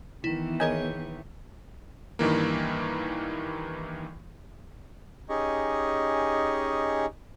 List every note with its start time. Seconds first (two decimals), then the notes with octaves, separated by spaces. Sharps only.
0.24 D#3 E3 B3 E4
0.60 G#4 A#4 C#5 D#5 G#5 G6
2.19 G2 D#3 E3 A#3
5.29 C#4 D#4 G4 G#4 D#5 C#6